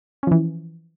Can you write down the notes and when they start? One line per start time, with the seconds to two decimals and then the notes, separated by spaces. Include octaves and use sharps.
0.23 C#4
0.27 F3
0.31 E3